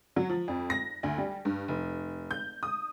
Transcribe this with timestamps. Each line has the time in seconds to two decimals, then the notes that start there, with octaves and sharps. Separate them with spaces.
0.16 F#3
0.30 F3
0.48 F2
0.70 A#6
1.03 D2
1.18 G3
1.45 G2
1.68 F1
2.31 G6
2.63 D#6